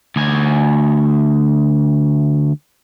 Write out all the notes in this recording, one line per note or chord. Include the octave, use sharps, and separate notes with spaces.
D2 G#5